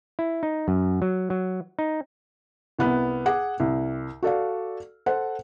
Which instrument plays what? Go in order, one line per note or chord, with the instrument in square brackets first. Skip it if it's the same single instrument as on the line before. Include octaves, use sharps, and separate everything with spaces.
[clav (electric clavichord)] E4
D#4
F#2
F#3
F#3
D#4
[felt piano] C2 B3 F#6
G#4 F#5 D6
C2
F#4 A4 D5 F5
A4 C5 F#5